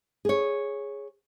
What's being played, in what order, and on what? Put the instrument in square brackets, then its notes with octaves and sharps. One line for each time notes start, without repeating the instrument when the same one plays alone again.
[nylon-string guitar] G#4 C#5